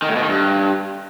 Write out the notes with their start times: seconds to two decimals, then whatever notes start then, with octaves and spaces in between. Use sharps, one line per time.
0.02 D#3
0.09 A2
0.16 B2
0.22 D#3
0.29 G2